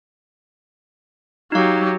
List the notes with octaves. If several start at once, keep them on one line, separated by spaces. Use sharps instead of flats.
F#3 D#4 G4 F5